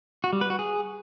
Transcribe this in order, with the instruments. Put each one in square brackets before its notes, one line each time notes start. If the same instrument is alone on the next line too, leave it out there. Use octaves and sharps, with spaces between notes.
[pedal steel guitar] F#4
G3
B4
F#4
G#4